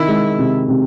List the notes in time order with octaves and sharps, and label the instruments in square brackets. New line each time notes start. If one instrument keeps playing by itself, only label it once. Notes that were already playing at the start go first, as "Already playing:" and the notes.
Already playing: [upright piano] C3 D#3 [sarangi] E4
[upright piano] G#3
C3
C3